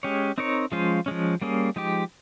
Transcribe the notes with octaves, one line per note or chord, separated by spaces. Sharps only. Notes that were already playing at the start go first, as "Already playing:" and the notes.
G#3 C#4 G4 C#5
C4 D#4 A#4 C#5
F3 G#3 C#4 F4 C5
F3 G#3 C#4
G3 A#3 C#4 G#4
F3 G#3 D#4 G4